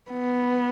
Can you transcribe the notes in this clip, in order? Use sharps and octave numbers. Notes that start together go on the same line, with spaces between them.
B3